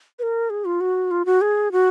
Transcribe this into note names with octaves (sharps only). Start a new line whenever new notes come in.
B4
A#4
G#4
F4
F#4
F4
F#4
G#4
F#4